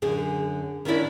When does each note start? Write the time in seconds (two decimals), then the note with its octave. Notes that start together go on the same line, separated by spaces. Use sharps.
0.02 F#2 D3 G#4
0.85 D#3 C#4 D4 E4 D5